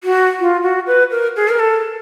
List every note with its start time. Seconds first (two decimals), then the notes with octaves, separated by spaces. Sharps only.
0.04 F#4
0.40 F4
0.63 F#4
0.87 B4
1.11 A#4
1.36 G#4
1.49 A#4
1.59 A4